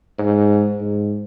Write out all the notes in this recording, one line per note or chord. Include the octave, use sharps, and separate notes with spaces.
G#2
G#2